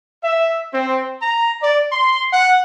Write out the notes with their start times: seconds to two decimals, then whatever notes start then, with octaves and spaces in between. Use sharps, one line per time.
0.23 E5
0.72 C4
1.21 A#5
1.62 D5
1.91 C6
2.32 F#5